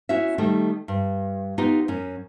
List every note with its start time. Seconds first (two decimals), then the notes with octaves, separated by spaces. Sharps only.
0.09 C#4 E4 F#4 E5
0.38 D#3 G3 A3
0.88 G2
1.58 B3 D#4 F4 G4
1.88 F#2 C#4